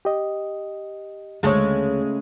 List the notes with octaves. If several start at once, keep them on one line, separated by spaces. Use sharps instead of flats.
G4 D#5
D2 C#3 G#3 A3 C#5